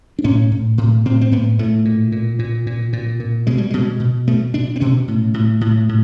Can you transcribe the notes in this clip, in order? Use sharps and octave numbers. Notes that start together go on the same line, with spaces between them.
D4
A2 C#4
A2
A2
A2 C4
C4
A2 B3
A2 A3
A#2
A#2
A#2
A#2
A#2
A#2
B2 G#3
G3
B2 G#3
B2
B2 A3
B2 D4
C4
B2 C#4
A2
A2
A2
A2